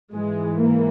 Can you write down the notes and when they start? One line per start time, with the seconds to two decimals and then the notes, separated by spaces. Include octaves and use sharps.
0.13 G#2 E3 G#3
0.60 A#3